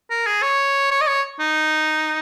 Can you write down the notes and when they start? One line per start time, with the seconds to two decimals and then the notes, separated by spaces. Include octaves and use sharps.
0.10 A#4
0.26 G#4
0.42 C#5
0.91 C#5
1.01 D#5
1.07 C#5
1.39 D#4